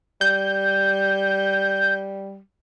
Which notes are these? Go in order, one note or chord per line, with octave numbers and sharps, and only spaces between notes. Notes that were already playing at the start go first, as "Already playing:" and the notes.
G3 G6